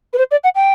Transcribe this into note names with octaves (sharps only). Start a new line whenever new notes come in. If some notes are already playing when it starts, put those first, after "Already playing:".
B4
C5
D5
F#5
G5